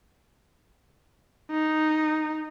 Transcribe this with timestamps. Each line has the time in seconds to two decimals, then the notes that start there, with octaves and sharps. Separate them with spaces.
1.51 D#4